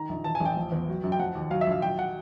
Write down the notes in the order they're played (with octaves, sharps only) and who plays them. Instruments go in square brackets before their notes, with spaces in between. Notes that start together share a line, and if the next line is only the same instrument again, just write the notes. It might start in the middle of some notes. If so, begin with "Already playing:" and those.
Already playing: [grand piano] D#3 A#5
A#1
E3 A5
G#5
A1 G5
F3
E2
F#3
F#2
G5
F3 F#5
D#2
F#3 F5
E5
A#1 F5
F#3 G5
F#5